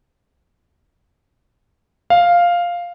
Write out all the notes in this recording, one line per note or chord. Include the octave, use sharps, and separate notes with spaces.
F5